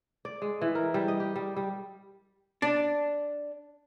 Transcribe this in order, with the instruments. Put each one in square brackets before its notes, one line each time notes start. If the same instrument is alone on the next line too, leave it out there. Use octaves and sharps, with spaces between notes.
[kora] D5
G#3
E3
A#4
G3
D#5
G4
G3
G3
[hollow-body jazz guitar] D4